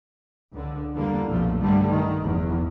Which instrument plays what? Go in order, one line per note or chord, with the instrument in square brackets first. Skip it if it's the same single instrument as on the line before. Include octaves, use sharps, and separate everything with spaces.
[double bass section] C#2 D3
E2 D3 G3 A#3
B1 F2 A#2 F3 A3
G2 D3 G3 A3
D#3
F1 E2